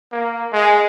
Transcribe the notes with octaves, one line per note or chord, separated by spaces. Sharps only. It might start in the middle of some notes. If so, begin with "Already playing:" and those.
A#3
G#3